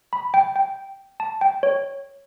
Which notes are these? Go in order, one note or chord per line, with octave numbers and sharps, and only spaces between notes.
B5
G5
G5
A5
G5
C#5